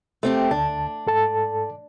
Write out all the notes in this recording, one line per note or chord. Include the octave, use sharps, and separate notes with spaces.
A3 C4 G4
D2 D4 A5
G#2 A4 A5